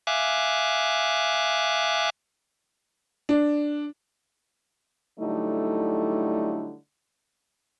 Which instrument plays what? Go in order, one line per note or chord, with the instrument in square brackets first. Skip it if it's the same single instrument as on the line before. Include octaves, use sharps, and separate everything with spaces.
[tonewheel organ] E5 F5 G#5 D6 F#6
[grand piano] D4
[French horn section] D3 F#3 G3 A3 D#4 E4